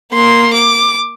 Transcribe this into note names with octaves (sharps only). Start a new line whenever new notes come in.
A#3 C6
D6